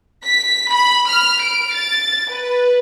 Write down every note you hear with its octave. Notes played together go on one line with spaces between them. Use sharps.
B6
B5
F6
D7
A6
B4